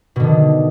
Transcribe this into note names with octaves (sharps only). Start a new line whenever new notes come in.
B2 D3 D#3